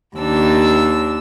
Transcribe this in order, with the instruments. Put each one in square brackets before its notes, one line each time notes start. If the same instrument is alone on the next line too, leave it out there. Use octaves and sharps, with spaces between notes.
[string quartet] D#2 D4 E6